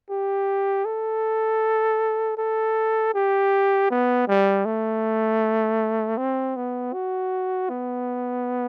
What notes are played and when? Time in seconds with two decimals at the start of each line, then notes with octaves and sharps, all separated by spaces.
0.10 G4
0.85 A4
2.37 A4
3.14 G4
3.90 B3
4.28 G3
4.65 A3
6.18 C4
6.57 B3
6.93 F#4
7.70 B3